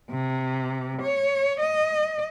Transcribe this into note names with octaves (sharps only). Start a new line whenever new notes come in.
C3
C#5
D#5